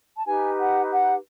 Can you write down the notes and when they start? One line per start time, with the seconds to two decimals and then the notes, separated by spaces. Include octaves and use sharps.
0.17 A5
0.27 D#4 G4 B4 G#5
0.59 F#5
0.92 F#5